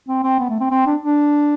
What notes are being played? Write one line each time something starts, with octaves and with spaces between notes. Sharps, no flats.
C4
C4
B3
A3
C4
C4
D4
D4